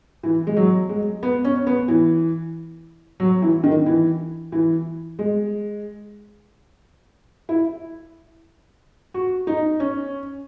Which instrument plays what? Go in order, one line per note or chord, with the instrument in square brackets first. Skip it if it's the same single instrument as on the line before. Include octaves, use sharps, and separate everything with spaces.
[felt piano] E3
G#3
F#3
G#3
B3
C#4
B3
E3
F#3
E3
D#3
E3
E3
G#3
E4
F#4
D#4
C#4